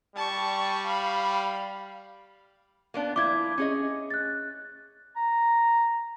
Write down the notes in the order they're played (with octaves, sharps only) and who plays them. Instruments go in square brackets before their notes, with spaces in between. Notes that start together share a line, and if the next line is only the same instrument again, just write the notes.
[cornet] G3 [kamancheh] A5 C#6
[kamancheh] F5 B5
[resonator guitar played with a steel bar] A#3 B3 D4
[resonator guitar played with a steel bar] F3 E4 [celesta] D6 G#6
[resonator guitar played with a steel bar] C#4 G#4 D#5
[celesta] F#6 A6
[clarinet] A#5